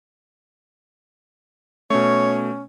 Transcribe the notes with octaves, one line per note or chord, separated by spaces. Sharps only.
B2 A3 C#4 C#5